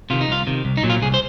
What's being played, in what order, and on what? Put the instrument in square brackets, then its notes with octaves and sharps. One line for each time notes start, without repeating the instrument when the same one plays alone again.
[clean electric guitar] C3 D#3 F4
D#4
C2 F4
C3 D#3
C2
D#4
A#2 F#3
F4
C2 G#4
C5